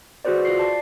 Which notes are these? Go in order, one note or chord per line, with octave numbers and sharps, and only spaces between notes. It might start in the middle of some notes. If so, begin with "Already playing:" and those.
F#4 G#4 B4 C5 D5
F4 C7
D5 A5